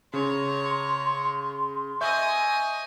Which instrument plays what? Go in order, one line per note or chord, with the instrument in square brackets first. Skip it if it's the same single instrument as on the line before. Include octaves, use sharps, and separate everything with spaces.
[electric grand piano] C#3 [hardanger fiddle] C#5 A#5 [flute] C6
[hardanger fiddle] D#5 G#5 [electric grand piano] E5 C#6 G6